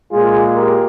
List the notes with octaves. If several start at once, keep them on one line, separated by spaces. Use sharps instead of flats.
A#2 G#3 F4 G#4
G4 A#4